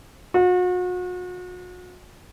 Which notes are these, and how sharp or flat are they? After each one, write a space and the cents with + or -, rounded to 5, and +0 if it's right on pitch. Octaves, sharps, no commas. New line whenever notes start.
F#4 -40